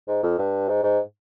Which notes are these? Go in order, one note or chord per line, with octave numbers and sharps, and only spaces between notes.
G#2
F2
G2
G#2
G#2